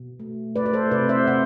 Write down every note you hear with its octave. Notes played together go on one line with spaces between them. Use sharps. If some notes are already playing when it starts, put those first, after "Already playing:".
Already playing: B2
A3
A3 B4 D5
D5
A4 C5
C3 B4 D5
C5 E5
C3 D5 F#5